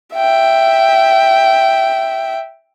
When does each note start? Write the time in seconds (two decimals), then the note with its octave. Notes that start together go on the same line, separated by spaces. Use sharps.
0.14 E5 G5